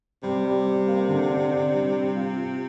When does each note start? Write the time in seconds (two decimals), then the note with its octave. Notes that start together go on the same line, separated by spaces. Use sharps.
0.23 C3 G3
0.45 G3
0.67 G3
0.88 A#3
1.09 D3
1.31 D4
1.52 D4
1.74 G3
1.95 G3
2.16 F4
2.38 F4